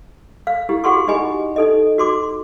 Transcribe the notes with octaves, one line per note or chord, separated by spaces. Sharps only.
F5
E4 G4
F#4 G#4 F#5 C6 C#6
D#4 G4 D#5 G#5 B5
D#4 A4 D#5
F#4 C6 D6